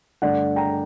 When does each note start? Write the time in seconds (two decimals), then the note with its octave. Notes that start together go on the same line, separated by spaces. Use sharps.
0.22 G2 D3 A3 D5 F#5
0.56 G5 A#5